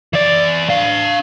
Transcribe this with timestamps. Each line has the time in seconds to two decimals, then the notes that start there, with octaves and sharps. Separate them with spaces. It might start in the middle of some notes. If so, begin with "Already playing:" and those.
0.13 E3 D5
0.69 D4 F5